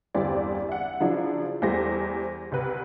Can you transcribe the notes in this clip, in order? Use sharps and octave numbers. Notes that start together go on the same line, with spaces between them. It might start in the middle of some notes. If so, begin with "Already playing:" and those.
G1 E2 G3 C4 E4 D5
E5 F#5
C#3 F3 F#3 D4 E4
E2 G3 A3 E4 C5 A#6
C2 B4